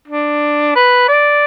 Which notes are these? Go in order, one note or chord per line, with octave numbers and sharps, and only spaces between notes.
D4
B4
D5